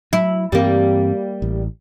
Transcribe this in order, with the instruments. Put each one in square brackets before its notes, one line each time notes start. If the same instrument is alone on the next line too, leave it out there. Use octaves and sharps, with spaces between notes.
[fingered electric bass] F#3 [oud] E4
[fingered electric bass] G2 E3 C4 [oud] G3 A#3
[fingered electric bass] A1